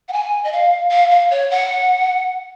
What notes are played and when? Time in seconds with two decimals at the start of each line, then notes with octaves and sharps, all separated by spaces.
0.08 F#5
0.13 G#5
0.44 D#5
0.52 F5
0.91 F5
1.11 F5
1.30 C#5
1.50 F#5